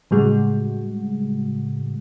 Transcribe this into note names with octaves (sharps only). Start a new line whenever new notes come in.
A2 C#3 G3 G#3 F#4